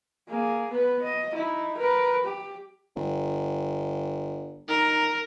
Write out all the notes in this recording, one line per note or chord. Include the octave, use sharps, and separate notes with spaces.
A#3 G#4
B3 B4
D#5
D#4 E4
A#4 B4
G4
G1
D#4 A#4